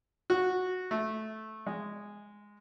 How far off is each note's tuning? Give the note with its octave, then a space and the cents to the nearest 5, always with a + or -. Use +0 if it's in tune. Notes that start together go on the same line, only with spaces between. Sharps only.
F#4 -10
A3 -10
G#3 -10